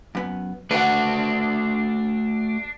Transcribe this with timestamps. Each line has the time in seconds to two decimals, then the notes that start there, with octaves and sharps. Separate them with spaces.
0.15 F#2 B3
0.71 A3 D4 F#4 B4 F#5